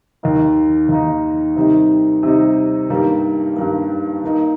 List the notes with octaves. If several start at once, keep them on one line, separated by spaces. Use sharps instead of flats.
D#2 D#3 A#3 D#4
D#2 D#3 A#3 D#4
C3 D#3 G3 D#4
C3 D#3 G3 D#4
G2 D#3 G3 A#3
G2 D#3 G3 A#3
D#3 A#3 D#4